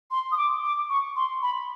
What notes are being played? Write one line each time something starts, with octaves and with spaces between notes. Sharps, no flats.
C6
D#6
D6
D6
C#6
C6
B5